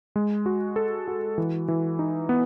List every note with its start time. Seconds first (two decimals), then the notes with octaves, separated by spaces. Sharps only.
0.16 G#3
0.46 F#4
0.76 A4
1.08 F#4
1.38 E3
1.68 E3
1.99 D#4
2.29 B3